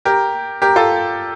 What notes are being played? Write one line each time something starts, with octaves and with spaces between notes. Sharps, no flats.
G4 A#4
G4 A#4
F4 A4